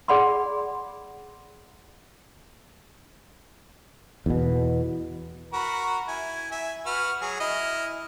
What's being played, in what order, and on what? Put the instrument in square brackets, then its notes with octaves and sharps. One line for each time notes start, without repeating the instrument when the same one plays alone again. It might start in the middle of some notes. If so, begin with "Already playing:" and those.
[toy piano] G#4 D5 F#5 B5 C6
[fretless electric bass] E2 B2
[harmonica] F#4 A#4 B5
E4 G#5
E5 G#5
F#4 B4 F6
F#3 G#4
E4 D#5 F6